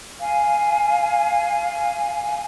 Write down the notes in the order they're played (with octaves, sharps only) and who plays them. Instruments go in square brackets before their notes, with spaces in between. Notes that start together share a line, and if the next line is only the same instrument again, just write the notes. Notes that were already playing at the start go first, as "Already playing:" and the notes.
[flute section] F5 G#5